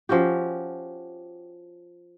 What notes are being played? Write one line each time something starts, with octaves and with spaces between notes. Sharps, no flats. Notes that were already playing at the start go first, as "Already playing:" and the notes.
F3 C#4 F#4 G4